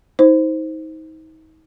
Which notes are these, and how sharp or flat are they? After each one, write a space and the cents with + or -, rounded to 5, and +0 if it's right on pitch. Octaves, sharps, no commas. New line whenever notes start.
D#4 +35 C5 +0